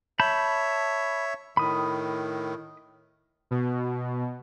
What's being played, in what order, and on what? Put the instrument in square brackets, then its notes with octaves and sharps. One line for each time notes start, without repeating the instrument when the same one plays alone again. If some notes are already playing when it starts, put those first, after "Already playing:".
[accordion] C#5 E5 [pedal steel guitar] A5 B5 G6
[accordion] A2 D#3 [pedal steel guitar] B5 D#6
[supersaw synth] B2